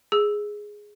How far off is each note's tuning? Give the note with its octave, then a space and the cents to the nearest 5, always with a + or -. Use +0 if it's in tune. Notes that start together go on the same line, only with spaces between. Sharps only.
G#4 +0 E6 +0